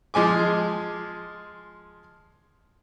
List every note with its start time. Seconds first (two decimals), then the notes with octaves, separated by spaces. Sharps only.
0.14 F3 G#3 G#5 D6